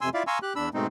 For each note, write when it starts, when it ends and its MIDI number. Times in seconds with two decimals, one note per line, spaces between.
0.01 0.09 41
0.01 0.09 48
0.01 0.09 80
0.01 0.09 84
0.01 0.09 88
0.14 0.23 64
0.14 0.23 65
0.14 0.23 74
0.14 0.23 76
0.14 0.23 77
0.27 0.39 77
0.27 0.39 80
0.27 0.39 82
0.27 0.39 84
0.27 0.39 85
0.27 0.39 88
0.42 0.53 67
0.42 0.53 90
0.56 0.69 40
0.56 0.69 62
0.56 0.69 83
0.56 0.69 88
0.74 0.87 44
0.74 0.87 47
0.74 0.87 56
0.74 0.87 57
0.74 0.87 60
0.74 0.87 63